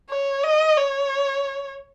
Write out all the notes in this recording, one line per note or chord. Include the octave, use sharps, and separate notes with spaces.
C#5
D#5
C#5